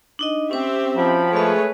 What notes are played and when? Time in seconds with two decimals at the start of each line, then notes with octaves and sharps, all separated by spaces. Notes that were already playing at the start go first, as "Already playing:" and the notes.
0.19 D4 D#4 D#5
0.51 C4 C#4 G4 C5 E5
0.97 F3 F#3 G5 B5
1.33 G#3 A3 G#4 A4 B4 C#5 E5